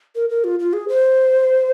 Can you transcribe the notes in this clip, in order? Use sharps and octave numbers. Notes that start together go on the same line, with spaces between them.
A#4
A#4
F4
F4
G#4
C5